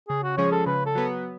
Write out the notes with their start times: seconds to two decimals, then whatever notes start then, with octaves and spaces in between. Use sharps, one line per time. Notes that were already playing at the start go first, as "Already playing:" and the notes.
0.09 C#3 G#4
0.23 F#4
0.37 F3 G#3 C#4 G#4 C#5
0.52 A4
0.66 C#3 B4
0.86 A4
0.95 F#3 B3